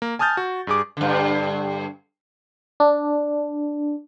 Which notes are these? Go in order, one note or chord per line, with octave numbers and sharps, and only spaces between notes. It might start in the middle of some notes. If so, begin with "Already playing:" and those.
A#3
G#5 A5 D#6 F6 G6 A6
F#4
G2 G#4 D6
G2 D3
D4